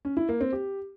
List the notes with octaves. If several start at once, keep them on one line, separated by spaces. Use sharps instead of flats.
C#4
E4
A#3
C4
G4